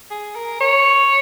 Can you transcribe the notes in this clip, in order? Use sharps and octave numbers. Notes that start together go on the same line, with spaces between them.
G#4
A#4
C#5